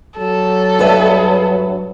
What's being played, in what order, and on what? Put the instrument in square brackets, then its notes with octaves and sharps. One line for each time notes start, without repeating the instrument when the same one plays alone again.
[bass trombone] F#3 [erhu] A4
[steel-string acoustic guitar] G2 B4 E5